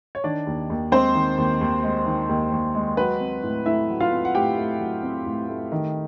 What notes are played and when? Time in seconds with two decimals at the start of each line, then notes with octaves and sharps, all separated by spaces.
0.15 C#5
0.24 D#3 D4 D5
0.47 D#2
0.70 D#2
0.92 G#3 C4 C5
1.15 D#3
1.38 D#2
1.61 D#2
1.84 G#3
2.06 D#3
2.29 D#2
2.52 D#2
2.75 G#3
2.97 F#3 B4
3.20 C4
3.43 A2
3.66 A3 E4 E5
3.89 F#3
4.01 F4 F5
4.12 C4
4.25 F#5
4.34 A2 G4 G5
4.57 A3
4.80 F#3
5.03 C4
5.26 A2
5.49 A3
5.72 D#3